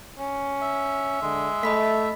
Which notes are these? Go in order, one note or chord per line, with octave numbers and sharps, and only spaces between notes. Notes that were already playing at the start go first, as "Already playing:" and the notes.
C#4
E5
D3 G#3
A3 D#5 B5 B6